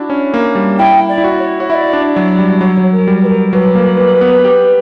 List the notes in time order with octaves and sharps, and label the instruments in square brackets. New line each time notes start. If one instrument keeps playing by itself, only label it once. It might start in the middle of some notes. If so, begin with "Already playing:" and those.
Already playing: [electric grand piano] D4 E4 F#4
C#4
A#3
G3
[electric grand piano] E4 [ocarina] G5
[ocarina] D5
[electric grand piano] E4
F#4
[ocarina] C#5
[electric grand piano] F#4
[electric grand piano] E4 [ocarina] D5 E5
[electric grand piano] D4
[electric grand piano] F#3 [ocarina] D5
[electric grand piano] G3
[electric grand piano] F#3 [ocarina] C#5
[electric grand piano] F#3
[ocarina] A#4
[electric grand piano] G3
[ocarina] B4
A#4
[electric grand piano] F#3 [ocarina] B4
[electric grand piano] A#3
A#3
B3
G4